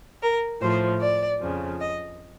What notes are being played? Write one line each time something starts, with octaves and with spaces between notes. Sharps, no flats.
A#4
A2 F3 C5
D5
F2 C#3 F3
D#5